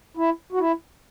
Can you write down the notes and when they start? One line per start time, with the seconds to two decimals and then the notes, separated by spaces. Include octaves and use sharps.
0.17 E4
0.52 F#4
0.59 E4